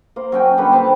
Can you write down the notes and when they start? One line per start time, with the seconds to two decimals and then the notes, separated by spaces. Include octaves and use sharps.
0.16 A#3 C5
0.32 F#3 C#4 G5
0.58 A#2 D3 G3 B4
0.72 C5 A5 B5